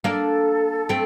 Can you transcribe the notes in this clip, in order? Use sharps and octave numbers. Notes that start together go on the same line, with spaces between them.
A#3 D4 A4
A3 C4